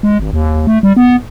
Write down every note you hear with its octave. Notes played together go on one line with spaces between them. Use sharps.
G#3
G#1
D#2
A3
G3
B3